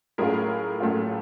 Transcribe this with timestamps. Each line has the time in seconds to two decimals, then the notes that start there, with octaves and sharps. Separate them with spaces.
0.18 A2 F#3 A3 C#4 F4 G#4 A#4
0.80 A2 F#3 A3 C#4 F4